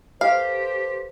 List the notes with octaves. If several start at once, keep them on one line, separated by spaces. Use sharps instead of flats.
G4 A4 B4 C5 F5